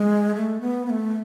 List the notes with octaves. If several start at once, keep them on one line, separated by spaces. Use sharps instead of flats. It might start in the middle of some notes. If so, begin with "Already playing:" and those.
Already playing: G#3
A3
B3
B3
A3